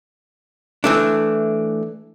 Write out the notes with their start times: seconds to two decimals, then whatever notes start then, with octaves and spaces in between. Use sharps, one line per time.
0.84 E3 A3 D4